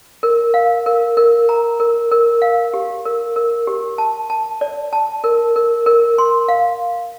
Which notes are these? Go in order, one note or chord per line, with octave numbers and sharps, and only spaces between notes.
A#4
F5
A#4
A#4
A#5
A#4
A#4
F5
G4
A#4
A#4
G4
A5
A5
D5
A5
A#4
A#4
A#4
C6
F5